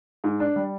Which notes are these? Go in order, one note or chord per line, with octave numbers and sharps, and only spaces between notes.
G#2
D4
G3